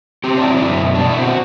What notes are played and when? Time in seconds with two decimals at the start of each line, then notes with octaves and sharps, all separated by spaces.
0.24 C4 G4
0.37 D4
0.42 F#3 E4
0.57 D4
0.62 F#2 E4
0.80 B2
0.94 B2 D4
1.09 E4
1.18 C4 F#4